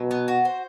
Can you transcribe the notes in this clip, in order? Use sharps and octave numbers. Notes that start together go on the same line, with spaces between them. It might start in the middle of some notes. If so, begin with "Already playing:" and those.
Already playing: B2 F#3
B3
F#4
C5